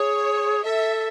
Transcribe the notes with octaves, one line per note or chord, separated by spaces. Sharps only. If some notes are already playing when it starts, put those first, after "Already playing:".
Already playing: G#4 C#5
A4 E5